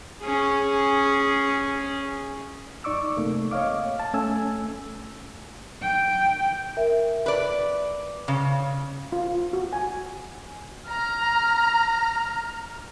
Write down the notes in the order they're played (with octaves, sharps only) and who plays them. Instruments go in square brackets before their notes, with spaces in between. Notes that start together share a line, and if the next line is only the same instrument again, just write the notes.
[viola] C#4 G#4
[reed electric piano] F#2 D#4 D5 C#6 D6 E6
C3 A3 A#3
C#5 D#5 F5 D6
A5
A3 C#4 G#5 E6
[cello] G5
[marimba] A#4 E5
[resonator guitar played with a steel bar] B4 D5
C#3
[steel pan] F4
F#4
G#5
[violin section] A#5 F6